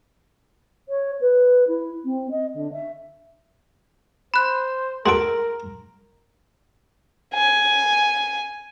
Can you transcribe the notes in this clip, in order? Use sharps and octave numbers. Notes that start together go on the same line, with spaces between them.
C#5
B4
E4
C4
D#5
D3
E5
C5 B5 F#6
G#3 F#4 A4 A#4 C6 D7
G#5